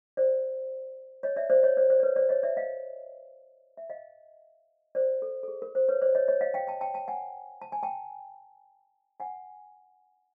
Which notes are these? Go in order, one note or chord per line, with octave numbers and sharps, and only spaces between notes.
C5 D5
C#5 D#5
D5 E5
C5 D5
C#5 D#5
C5 D5
C5 D5
D5
B4 C#5
C5 D5
C#5 D#5
D5 E5
D#5 F5
E5
D#5 F5
C5 D5
A4
A4
G#4
A#4
C5
B4 C#5
C5 D5
C#5 D#5
C#5 D#5
D#5 F5
F5 G5
G5 A5
G5 A5
G5 A5
F#5 G#5
A5
G#5
G5 A5
F#5 G#5